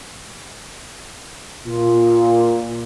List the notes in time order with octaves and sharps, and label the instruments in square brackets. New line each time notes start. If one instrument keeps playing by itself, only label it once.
[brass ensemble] A#2 [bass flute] F4